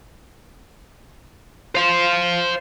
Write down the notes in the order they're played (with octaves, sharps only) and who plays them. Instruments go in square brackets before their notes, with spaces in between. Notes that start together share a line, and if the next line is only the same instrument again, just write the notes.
[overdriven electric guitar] C5 F5